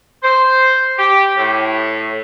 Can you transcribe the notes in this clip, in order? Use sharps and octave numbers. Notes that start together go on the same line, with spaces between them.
C5
G4
A2